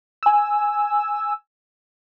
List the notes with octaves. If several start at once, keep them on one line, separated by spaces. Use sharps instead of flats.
G#5 E6